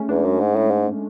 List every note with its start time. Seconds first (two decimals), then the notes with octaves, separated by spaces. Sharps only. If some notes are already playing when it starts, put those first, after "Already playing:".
Already playing: G#3 A3 C#4
0.09 E2 D4
0.25 F#2
0.40 G#2
0.56 A2
0.70 G#2